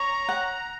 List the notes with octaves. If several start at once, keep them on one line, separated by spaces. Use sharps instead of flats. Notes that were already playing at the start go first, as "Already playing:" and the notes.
Already playing: C#5 A#5
F#5